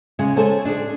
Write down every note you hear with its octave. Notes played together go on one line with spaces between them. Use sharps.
C#3 G#3
G#4 A4 C5 C#5 A5
D4 G#4